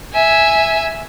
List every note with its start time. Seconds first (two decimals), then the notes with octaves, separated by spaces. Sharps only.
0.14 E5 G#5